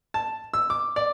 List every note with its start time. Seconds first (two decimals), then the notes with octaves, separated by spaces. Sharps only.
0.14 A5
0.54 E6
0.70 D6
0.96 D5